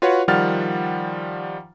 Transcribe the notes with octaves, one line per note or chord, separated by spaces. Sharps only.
F4 F#4 B4 C#5 F#5
D#3 F3 G3 F#5 F6 A6